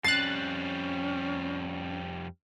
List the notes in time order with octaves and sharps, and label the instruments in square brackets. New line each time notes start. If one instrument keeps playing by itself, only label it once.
[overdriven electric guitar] F2 G3 [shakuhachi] C#4 [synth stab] F#6 A6 [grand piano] C7